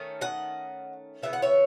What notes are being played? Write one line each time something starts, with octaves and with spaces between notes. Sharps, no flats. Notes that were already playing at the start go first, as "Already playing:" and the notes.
Already playing: D#3 A3 C#4
D#5 F#5
C#3 E3 B3 E5
F#5
C#5 E5